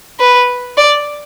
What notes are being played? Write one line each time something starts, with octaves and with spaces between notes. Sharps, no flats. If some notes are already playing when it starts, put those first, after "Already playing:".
B4
D5